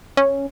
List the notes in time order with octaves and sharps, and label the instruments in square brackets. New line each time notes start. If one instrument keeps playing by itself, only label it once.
[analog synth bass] C#4